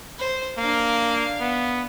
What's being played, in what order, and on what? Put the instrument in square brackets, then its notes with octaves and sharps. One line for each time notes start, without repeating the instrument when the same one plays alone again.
[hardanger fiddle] C5
[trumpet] A#3 [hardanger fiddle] D4 F5
[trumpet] B3